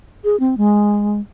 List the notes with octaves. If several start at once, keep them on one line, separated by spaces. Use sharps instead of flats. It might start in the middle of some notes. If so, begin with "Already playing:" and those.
G#4
C4
G#3